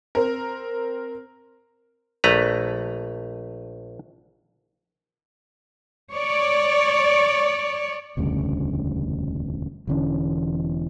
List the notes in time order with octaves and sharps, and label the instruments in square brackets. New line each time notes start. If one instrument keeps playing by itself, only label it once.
[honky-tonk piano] C4 A#4
[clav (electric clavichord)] A#1 A3 B4 A#5
[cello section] C#5 D5
[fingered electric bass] E1 D2 G2 C#3
E1 D3 E3 C#4